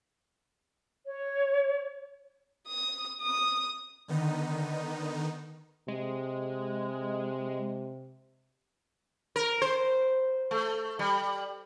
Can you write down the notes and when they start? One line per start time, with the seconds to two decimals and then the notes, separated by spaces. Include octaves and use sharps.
1.07 C#5
2.68 D#6
3.22 D#6
4.08 D3 D#3 B3 D#4
5.88 C3 G#3
9.36 A#4
9.62 C5
10.51 A3
10.99 G3